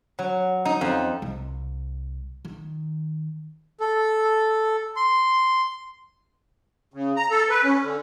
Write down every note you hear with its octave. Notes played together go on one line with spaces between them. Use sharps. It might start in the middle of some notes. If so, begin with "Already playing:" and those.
F#3
D#4
F2
C2
D#3
A4
C6
C#3
A#5
A4
B4
C#4
D3